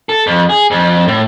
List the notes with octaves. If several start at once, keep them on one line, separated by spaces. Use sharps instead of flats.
A4
F2
G#4
F2
A2